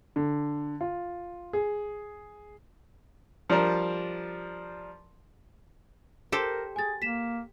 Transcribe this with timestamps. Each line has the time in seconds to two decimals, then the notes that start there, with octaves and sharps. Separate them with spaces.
0.16 D3
0.81 F4
1.53 G#4
3.50 F3 G3 D4 A#4
6.32 G4 A4 A#4 C5
6.76 G#4 G#5 A6
7.02 A#3 B6 E7